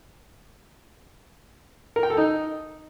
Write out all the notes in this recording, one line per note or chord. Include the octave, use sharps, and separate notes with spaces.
A#4
G5
A4
D#4